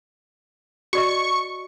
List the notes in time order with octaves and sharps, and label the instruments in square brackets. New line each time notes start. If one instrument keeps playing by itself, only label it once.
[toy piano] F#4 D5 D#5 [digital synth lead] C#6